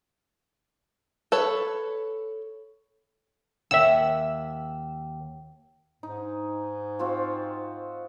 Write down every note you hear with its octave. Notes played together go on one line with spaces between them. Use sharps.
A4 B4 C#5
D#2 E5 F#5 E6
G#2 D#4
C4 F4 F#4